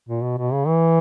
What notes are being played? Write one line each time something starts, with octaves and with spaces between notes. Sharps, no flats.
A#2
B2
B2
C#3
E3